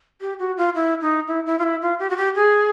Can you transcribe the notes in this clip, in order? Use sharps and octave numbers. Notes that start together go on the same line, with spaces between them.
G4
F#4
F4
E4
D#4
E4
E4
F4
E4
F4
G4
F#4
G4
G#4